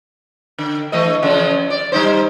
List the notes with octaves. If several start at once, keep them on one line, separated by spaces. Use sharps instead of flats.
D3
E3 A3 D#5
C#3 F3 C4
D5
G3 D#4 C5